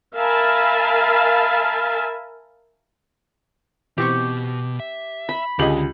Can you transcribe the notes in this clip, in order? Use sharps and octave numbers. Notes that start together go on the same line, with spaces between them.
A#4 E5 F5 G#5 A5 B5
B2 E3 C4 G4 C#6
E5
B5
C#2 D3 G4 G#4 D#5 F#7